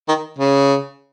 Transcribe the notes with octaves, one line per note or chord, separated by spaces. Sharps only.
D#3
C#3